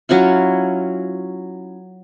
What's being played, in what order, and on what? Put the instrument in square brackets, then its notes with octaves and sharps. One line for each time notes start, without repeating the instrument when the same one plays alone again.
[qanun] F#3 C#4 E4 F4